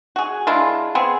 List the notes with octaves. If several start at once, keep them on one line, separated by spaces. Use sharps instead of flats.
F#4 G#4
G#3 D4 E4 F4
B3 C4 G#4